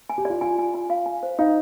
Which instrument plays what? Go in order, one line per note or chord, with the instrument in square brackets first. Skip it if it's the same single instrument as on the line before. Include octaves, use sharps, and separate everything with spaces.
[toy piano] G#5
[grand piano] G4
[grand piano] F4 [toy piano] D5
[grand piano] F4 [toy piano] G#5
[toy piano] G#5
G#5
F5
G#5
C5
[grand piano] D#4 [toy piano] F5